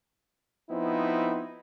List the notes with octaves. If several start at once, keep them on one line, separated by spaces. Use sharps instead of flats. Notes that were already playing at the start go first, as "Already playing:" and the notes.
F3 B3 C4 D#4 E4